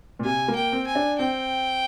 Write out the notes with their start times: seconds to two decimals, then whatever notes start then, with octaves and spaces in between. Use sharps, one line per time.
0.19 A#2
0.25 C3 G#5
0.48 A#3
0.55 G5
0.72 C4
0.87 G#5
0.95 D4
1.19 C4 G5